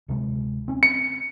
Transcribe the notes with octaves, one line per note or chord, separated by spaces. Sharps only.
D1 C3 G#3
C4 C#4
C#7